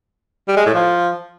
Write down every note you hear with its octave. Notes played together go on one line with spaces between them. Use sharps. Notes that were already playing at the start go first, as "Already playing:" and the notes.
G3
G#3
A2
F3